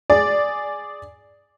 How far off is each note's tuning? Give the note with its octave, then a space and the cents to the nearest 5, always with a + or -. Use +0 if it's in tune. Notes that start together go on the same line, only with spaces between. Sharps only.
G#4 +0 D5 +0